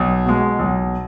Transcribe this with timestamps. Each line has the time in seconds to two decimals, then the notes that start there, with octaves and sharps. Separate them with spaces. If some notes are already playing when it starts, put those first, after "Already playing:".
Already playing: B1
0.26 B2 G#3
0.59 B1